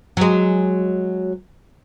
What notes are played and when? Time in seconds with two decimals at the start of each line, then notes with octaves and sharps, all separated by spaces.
0.17 F#3 G#3